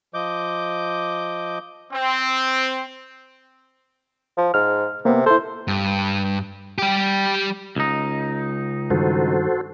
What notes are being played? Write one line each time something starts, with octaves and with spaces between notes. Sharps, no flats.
F3 D#5 D6 G6
C4
F3
G#2 F6
C3 A#3 B3
E4 A4 C5
G2
G3 G4
C#2 D#4
G2 D#3 F#4 A4 C5